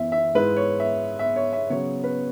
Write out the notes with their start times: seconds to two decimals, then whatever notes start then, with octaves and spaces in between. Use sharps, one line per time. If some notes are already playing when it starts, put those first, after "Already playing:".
Already playing: F#2 E3 B3 E5
0.12 E5
0.35 G#2 G#3 E4 B4
0.57 C#5
0.80 E5
1.19 E5
1.36 C#5
1.53 E5
1.70 C#3 F#3 B3 C#5
2.04 B4